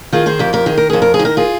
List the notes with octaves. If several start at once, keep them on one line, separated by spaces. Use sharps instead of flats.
D#3 F4 G#4
G#4 C5
F2 G4 A#4
G4 A#4
D#3 G#4
A#4
F2 G#4
A#4
G#4
D#3
A#4
F4 G#4